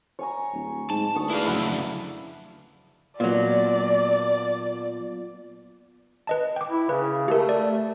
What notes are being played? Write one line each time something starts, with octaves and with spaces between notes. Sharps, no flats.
C#5 G#5 A#5
D1
G#2 A5
D2 A5 C#6 D#6
E4 G#4 B4 D5 F5
F2 C#3 F#3 E4 F#5
A#2 F#3 B3 F4 D5
B4 D#5 A5
G5 D6
E4
C#3 B4
A3 G4 A#4
D5